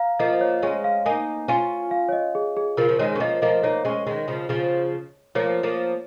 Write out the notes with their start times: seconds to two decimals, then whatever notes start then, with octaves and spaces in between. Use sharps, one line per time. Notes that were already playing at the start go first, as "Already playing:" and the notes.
Already playing: F5 A#5
0.19 F3 A#3 D#5
0.41 C#5
0.62 G#3 C#4 C#5
0.84 F5
1.06 A#3 D#4 G#5
1.48 C#4 F4 G#5
1.91 F5
2.09 C#5
2.12 D#5
2.35 G#4
2.57 G#4
2.77 C#3 F3 A#4
2.89 F3
2.99 D#3 G#3 C#5
3.15 C#4
3.20 F3 A#3 D#5
3.42 F3 A#3 D#5
3.63 A#3 D#4 C#5
3.85 G#3 C#4
4.07 D#3 G#3
4.28 C#3 F3
4.49 C#3 F3
5.35 F3 A#3 C#5
5.63 F3 A#3